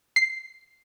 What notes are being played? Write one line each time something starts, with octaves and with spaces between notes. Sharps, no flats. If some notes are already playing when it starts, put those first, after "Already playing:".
C7